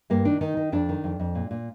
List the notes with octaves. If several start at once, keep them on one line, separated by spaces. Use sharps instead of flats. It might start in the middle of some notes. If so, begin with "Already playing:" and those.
G2 A#3
D#3 D4
D#3 D#4
D#3
F2 D4
D#3
F2
F2
A#2
A#2